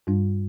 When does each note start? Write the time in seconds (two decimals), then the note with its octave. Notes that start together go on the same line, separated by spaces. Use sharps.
0.07 G2 G3 D4